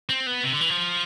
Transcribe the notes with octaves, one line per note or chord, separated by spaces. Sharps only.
C4
B3
C3
D3
E3
F3